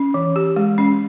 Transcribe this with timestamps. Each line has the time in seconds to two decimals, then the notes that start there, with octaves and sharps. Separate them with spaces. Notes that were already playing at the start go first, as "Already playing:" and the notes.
Already playing: C#4
0.14 E3
0.36 G4
0.56 G#3
0.78 C#4